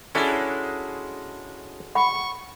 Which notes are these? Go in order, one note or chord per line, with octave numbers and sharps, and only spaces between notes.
G#3 C#4 D4 E4 F#4 A4
F#5 B5 C#6